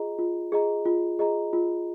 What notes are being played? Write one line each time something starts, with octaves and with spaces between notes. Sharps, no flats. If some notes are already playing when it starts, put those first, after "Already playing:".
Already playing: F4 G#4 D#5 A#5
F4
G#4 D#5 A#5
F4
G#4 D#5 A#5
F4